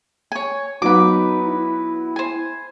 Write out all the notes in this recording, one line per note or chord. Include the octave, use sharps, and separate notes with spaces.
C#5 G#5
F#3 B3 D#4 B4 D6
E4
C5 G#5